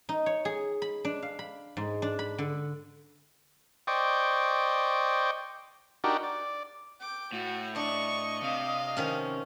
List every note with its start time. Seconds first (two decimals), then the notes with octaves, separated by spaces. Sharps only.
0.09 D#4
0.26 C#5
0.45 G#4
0.82 B5
1.05 D4
1.22 F5
1.39 B5
1.77 G#2
2.02 D4
2.19 B5
2.38 D3
3.87 C5 D5 D#5 G5 C#6
6.04 D4 D#4 F#4 G4 A#4
6.23 D5
7.01 G5 D6
7.32 A2 F#4
7.76 D4 D#5 C#6
8.43 C3 F5
8.97 D#3 F3 C#4